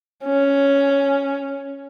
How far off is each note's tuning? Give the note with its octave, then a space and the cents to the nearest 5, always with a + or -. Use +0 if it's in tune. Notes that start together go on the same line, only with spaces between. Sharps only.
C#4 +5